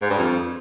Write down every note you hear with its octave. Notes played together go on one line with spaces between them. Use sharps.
G#2
G2
F2